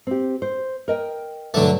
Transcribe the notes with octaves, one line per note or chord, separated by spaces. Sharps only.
C4 G4
C5
A#4 D#5 G5
G2 D3 F#3 A3